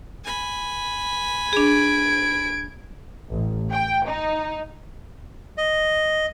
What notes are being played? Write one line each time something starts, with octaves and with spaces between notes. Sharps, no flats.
G#5 B5
D4 G#4 G#6 D7
A1
G5
D#4
D#5